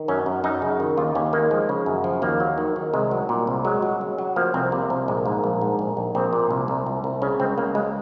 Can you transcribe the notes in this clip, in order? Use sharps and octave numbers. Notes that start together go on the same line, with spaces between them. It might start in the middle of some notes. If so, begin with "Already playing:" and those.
Already playing: D#3
F#2 C#4
F#2
F#2 D#4
C#3
D#3
D#2 F4
D#2 C#4
D#3 A#3
F3 G#3
C#3
F#2
F3
D#2 A#3
F#3
D#3
D#3
C2 G#3
F#3
A#2
C2
F#3 G#3
F#3
C#3
F#3
F3 A#3
C2 C4
C3 A#3
C2
A#1 G#3
G#2 A#3
A#1
G#2
A#1
A#1
A#1 C4
A#2
C2
C2
C2
C2
C#3 C#4
C#2 C4
C#2 A#3
C#2 G#3